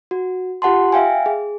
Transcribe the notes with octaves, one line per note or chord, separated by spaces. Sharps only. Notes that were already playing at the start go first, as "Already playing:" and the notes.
F#4
F4 G4 F#5 A5 C6
E5 F5 G5 G#5
G#4